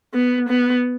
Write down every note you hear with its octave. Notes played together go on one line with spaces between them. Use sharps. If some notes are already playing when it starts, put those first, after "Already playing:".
B3
B3